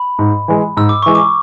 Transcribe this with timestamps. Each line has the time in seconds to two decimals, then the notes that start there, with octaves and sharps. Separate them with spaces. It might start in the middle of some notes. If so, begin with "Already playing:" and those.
Already playing: B5
0.19 G#2
0.48 E3 G#3
0.77 G#2 E6
0.89 D6
1.03 E3 G#3 C#6
1.15 D6